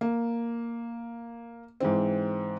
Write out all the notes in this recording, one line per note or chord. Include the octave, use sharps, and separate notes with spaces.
A#3
G#2 E3 C4